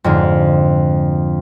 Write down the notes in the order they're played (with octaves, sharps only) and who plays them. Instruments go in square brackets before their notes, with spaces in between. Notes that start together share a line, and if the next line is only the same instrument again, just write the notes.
[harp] F2 G#2 D3